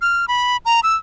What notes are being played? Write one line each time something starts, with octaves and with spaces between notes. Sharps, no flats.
F6
B5
A#5
E6